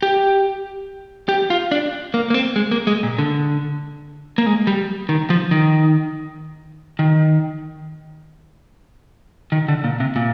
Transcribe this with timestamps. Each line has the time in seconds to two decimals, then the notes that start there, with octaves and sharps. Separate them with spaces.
0.02 G4
1.29 G4
1.50 F4
1.71 D4
2.14 A#3
2.30 A#3
2.34 C4
2.56 G#3
2.71 A#3
2.87 G#3
3.03 A#2
3.19 D3
4.38 A#3
4.46 G#3
4.67 G3
5.09 D#3
5.30 F3
5.51 D#3
6.99 D#3
9.52 D#3
9.68 D3
9.84 A#2
10.00 C3
10.16 A#2